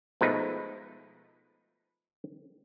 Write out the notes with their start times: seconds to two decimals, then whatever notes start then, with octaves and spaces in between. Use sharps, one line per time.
0.21 B2 F3 G#3 A3 D#4 B4